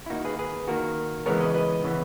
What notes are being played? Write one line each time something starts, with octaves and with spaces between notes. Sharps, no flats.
E4
D#3 A#3 D#4 F#4
G#4 B4
G#4 B4
D#3 A#3 F#4 A#4
C#3 E3 G#3 B3 A#4 C#5
B4 D#5
B4 D#5
C#3 E3 B3